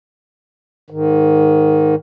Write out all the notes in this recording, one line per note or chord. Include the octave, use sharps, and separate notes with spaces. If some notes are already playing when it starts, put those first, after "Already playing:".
G#2 D#3